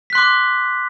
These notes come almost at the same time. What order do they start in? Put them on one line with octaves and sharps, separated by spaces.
B6 F#6 C6 D6